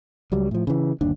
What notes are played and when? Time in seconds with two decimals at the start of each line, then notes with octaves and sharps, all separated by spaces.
0.32 C#2 F#3 G3
0.51 A2 F3
0.67 C#3 E3
1.01 G1 D#2 D4